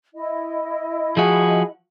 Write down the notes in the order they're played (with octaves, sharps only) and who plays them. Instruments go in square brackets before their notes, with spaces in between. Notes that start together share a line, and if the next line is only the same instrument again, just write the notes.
[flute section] E4 D#5
[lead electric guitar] F3 F#4 [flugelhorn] G#4